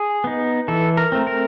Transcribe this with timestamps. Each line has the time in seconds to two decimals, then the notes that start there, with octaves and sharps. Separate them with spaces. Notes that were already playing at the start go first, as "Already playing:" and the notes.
Already playing: G#4
0.24 B3 D#4
0.68 E3 A4
0.97 A#4
1.12 A3 C4
1.27 A#4